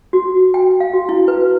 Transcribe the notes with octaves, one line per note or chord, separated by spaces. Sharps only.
F#4
G5
F5
F#4
E4
B4